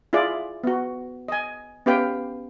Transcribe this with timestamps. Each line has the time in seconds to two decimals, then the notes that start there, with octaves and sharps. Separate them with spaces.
0.13 E4 F4 G#4 D5
0.64 B3 F#4
1.28 D#5 G#5
1.86 B3 C#4 G4 B4 F5 G5